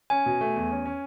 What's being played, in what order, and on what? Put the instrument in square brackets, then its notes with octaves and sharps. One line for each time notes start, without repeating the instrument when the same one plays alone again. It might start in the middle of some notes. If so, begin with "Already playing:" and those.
[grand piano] C#4 [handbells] G#5
[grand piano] B2
A3
E2
C#4
C#4